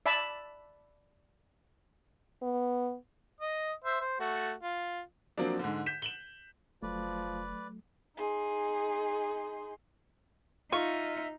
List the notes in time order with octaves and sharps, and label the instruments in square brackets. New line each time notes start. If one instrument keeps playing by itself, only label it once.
[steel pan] D5 E5 A5 B5
[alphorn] B3
[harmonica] D#5
C5 E5
C5
A3 F#4
F4
[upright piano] F3 F#3 A#3 C4 D4
G#2 D3
G6 B6 E7
E7 F#7 G7
[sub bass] F1 [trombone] F3 [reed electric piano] F#3 A3 [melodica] B4 D5
[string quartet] D#4 G#4 C6
[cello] D#4 [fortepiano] F4 [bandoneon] E5 [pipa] C#6